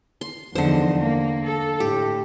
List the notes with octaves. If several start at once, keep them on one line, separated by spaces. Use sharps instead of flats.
C6
E2 D3 F3 D#4 C5
A#3
A4
A2 G4